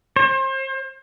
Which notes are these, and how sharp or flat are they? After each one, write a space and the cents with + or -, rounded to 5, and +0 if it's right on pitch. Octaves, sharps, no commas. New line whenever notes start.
C5 +35